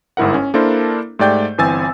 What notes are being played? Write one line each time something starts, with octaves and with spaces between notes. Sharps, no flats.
G1 G#2 E4 A#4 F#5
C#4
A#3 D4 E4 A4 A#4 C5
G#2 A3 G4 D5 G5 G6
G1 E3 C4 G#5 E6 A6